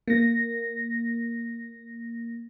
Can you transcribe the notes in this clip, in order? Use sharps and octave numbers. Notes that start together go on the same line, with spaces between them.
A#3 A#6